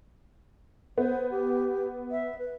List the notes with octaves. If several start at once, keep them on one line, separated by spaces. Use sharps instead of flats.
B3 C5
G4
E5
B4